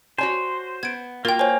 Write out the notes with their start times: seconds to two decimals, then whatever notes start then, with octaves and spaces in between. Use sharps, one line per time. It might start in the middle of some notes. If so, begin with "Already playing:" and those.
0.18 F#4 C5 C#5 G#5
0.83 B3 G#6 D7
1.25 A#3 F4 F#4 A#4 G5
1.39 C5 C#5 G#5